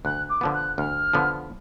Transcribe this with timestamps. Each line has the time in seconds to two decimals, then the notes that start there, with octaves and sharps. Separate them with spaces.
0.05 D2 F#6
0.29 D6
0.41 D3 F3 B3
0.53 F#6
0.78 D2 F6
1.14 D3 F3 B3